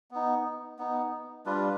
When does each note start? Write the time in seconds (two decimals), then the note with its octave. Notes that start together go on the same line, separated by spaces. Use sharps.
0.11 B3 D#4
0.79 B3 D#4
1.46 G3 D4 F4 B4